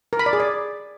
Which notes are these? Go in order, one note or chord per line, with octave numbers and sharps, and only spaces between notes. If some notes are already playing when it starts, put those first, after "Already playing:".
A#4
B5
D5
G#4
D5